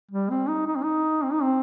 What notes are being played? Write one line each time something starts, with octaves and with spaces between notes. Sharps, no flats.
G3
C4
D#4
D#4
C4
D#4
C4
D#4
C4